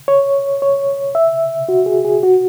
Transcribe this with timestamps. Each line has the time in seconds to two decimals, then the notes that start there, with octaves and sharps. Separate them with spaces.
0.08 C#5
0.62 C#5
1.15 E5
1.69 F#4
1.86 G#4
2.05 G#4
2.23 F#4